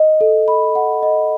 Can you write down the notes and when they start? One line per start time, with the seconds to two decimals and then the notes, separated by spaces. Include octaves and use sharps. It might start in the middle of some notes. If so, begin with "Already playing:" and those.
Already playing: D#5
0.21 A4
0.48 B5
0.75 F#5
1.03 D#5